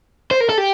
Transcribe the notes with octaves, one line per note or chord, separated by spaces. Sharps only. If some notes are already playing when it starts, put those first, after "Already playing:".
C5
A#4
A4
G4